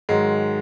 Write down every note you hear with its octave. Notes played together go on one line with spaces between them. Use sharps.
G#2 D#3 F#3 G#3